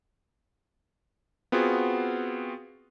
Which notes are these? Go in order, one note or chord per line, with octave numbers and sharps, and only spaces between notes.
B3 C4 F4 F#4 G#4